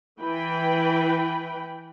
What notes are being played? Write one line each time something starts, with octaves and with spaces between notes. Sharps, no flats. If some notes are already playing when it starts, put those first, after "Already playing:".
E3 B4 G5 B5